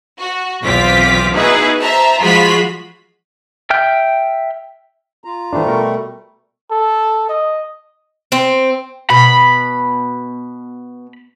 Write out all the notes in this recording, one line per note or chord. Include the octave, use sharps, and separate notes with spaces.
F#4
B1 E2 C4 F4 D6 B6
B3 D#4 E4 F#4 G#4 B4
C5 E5 A5 A#5
F3 G#3 F4 F#4 B5 B6
E5 G5 F6 G6
F4 A#5
A2 C3 E3 G3 A3 D4 C5
B2 A4 A#4 C#6
A4
D#5
C4
B2 B5